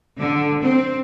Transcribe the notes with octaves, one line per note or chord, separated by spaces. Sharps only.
D3
C4